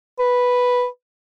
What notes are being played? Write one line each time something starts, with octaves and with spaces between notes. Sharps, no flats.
B4